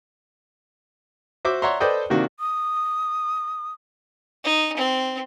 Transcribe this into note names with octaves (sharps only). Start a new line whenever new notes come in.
F#4 C5 E5 D6
C#5 D5 E5 F#5 A#5 C6
A4 B4 C5 D5 D#5 G5
C3 D#3 A#3 D4 F#4
D#6
D#4
C4